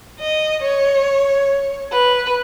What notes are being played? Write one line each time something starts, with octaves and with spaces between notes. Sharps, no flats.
D#5
C#5
B4